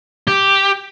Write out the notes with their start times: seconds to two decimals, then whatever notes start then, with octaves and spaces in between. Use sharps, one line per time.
0.28 G4